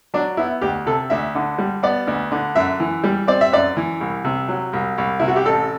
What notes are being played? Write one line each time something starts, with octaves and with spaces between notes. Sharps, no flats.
F#3 D4
B3 E4
D2 G4
C3 A4
D2 E5
D3
G3
B3 D5
D2
D3
F#2 E5
E3
G3
C4 D5
E5
F#2 D5
E3
C2
C3
F#3
C2
C2
C3 E4
F#4
G4
A1 A4